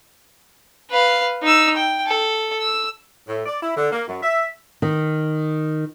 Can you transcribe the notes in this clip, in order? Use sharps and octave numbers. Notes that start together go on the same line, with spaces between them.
B4 F5
D#4 E6
G5
A4
E6
A2
D5
E4
D3
A#3
F#2
E5
D#3